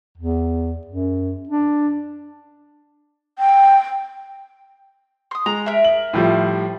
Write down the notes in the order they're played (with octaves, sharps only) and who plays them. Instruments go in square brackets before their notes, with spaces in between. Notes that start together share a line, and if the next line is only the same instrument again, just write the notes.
[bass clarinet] E2
F#2
D4
[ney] G5
[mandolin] C6 D#6
[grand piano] G#3 [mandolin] A#5
[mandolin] A#4 E5
[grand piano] F#7
A2 F3 G3